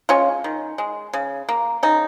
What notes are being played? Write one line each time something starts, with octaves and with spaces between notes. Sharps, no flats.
G#3 C#4 F4
D#3
G#3
C#3
A#3
C#3 D#4